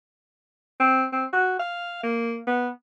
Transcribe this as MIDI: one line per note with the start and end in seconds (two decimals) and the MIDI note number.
0.80 1.05 60
1.13 1.25 60
1.33 1.58 66
1.60 2.00 77
2.03 2.40 58
2.47 2.69 59